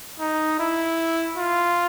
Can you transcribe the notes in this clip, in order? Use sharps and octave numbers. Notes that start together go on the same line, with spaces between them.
D#4
E4
F4